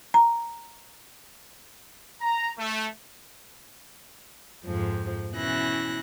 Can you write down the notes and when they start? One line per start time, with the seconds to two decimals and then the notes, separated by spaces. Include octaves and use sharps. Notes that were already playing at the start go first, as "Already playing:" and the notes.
0.14 A#5
2.22 A#5
2.58 A3
4.65 F2 G#2 F3
5.33 B2 E3 C#4 E4 F#6 A#6